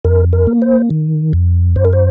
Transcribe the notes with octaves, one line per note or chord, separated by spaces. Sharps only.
F2 A#4
A#4
A#3
C5
D#3
F2
F#2 C5
A#4
C5